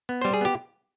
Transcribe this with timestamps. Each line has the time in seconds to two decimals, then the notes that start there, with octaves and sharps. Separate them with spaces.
0.09 B3
0.22 G3 C5
0.34 G#4
0.41 B3 G4